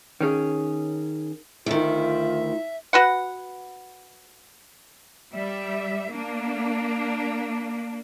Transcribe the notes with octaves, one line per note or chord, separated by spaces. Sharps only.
D#3 C#4 G#4
D2 D#3 F4 E5
F#4 B4 F#5
G3 E5
A#3 D4